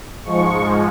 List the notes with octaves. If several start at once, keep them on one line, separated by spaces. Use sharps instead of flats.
G#2 F3 G#3 C#6